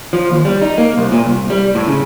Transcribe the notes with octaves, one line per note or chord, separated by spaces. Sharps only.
F3
D#2
G3
D#4
A#3
C2
A#2
C2
G3
A2
C#3